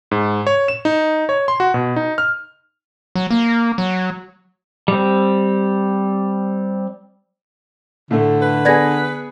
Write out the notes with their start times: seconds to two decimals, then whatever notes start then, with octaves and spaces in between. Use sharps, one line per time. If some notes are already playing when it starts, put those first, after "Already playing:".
0.11 G#2
0.47 C#5
0.68 E7
0.85 D#4
1.29 C#5
1.48 C6
1.60 F#4
1.74 B2
1.96 D#4
2.18 F6
3.15 F#3
3.31 A#3
3.78 F#3
4.88 G3 C4
8.11 A2 D3 A3
8.42 B4
8.65 B3 G#4 D5 G#6 A#6